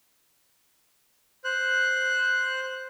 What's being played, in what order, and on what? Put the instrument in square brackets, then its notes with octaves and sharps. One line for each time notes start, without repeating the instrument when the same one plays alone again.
[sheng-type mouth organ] C5 F#6